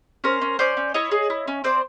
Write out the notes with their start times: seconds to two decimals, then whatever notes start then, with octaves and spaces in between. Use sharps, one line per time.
0.24 C#4 A#4 C5
0.42 C#4
0.59 C#4 C5 D5
0.77 C#4
0.94 E4 C#5 D#5
1.11 G#4
1.30 E4
1.48 C#4
1.64 C4 C5 D5